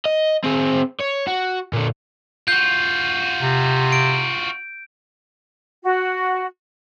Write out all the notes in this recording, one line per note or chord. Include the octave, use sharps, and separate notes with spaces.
D#5
C4 G#4
C#5
F#4
A#2 D3
F4 F#4 G6
C3
D7
F#4